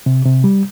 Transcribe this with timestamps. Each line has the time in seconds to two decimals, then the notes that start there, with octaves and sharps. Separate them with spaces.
0.06 C3
0.25 C3
0.44 G3